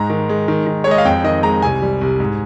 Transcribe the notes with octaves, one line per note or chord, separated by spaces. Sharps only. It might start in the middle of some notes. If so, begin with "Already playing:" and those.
Already playing: G#2 G#3 A#5
D#3
G#3
D#3
D#3
C#5
G#3 D#5
F5
F2 G5
D#3 D#5
G#3 A#5
C2 G#5
G3
C2
G#2